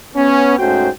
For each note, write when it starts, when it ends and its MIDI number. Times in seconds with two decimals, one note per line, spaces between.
0.16 0.55 59
0.16 0.55 61
0.58 0.89 44
0.58 0.89 57
0.58 0.89 61
0.58 0.89 66
0.58 0.89 72
0.58 0.89 79